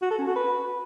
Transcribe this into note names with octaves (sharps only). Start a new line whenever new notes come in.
F#4
A4
C#4
F#4
B4